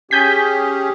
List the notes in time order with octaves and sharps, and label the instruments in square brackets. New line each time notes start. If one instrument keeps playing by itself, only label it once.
[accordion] C#4 G4 G#4 [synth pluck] G#5 G6 B6